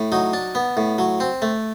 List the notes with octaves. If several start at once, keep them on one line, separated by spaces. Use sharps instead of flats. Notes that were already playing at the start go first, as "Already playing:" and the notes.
Already playing: A2
F#3 D#4
D4
B3
A2
F#3
C4
A3